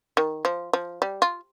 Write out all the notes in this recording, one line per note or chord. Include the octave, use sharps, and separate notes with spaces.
D#3
F3
F3
G3
F4